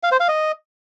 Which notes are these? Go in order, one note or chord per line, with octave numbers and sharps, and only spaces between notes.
F5
C5
F5
D#5